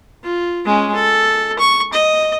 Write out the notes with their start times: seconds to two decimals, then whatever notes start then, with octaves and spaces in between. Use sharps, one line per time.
0.24 F4
0.65 G#3 C#4
0.95 A4
1.59 C#6
1.93 D#5